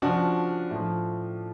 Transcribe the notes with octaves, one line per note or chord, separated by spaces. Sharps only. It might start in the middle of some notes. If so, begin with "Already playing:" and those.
C#3 F3 D4 F#4
A2 F3